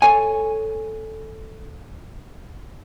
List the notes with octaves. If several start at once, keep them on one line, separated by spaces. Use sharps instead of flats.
A4 C#5 G#5